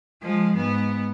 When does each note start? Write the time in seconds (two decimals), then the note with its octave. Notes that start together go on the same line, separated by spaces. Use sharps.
0.22 F3 G#3
0.56 G#2 B3